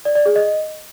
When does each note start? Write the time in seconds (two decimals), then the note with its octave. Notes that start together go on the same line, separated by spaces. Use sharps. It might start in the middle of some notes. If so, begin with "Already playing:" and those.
0.05 D5
0.15 D5
0.26 G#4
0.36 D#5